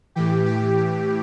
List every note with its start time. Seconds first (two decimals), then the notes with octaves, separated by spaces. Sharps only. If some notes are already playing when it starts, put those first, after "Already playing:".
0.15 A2 E3 G4
0.46 G4